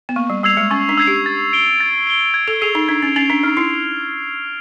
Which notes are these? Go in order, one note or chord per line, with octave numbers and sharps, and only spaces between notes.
B3
A#3 C#6
G3
G3 E6 G#6 C7 F7
G#3
C#4 C#6
D4
E6 G#6 C7 F7
G4
A6
D7 G7
A6
D7 G7
G#6
A4
G#4 C7 F7
D#4
D4 G#6
C#4
C#4 C7 F7
D4
D#4 F6
E4